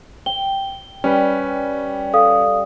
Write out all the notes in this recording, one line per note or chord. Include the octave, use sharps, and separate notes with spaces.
G5 G7
G3 C#4 B4
A4 F5 D#6